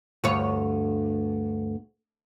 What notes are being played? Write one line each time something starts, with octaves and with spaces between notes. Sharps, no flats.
D2 G2 C#5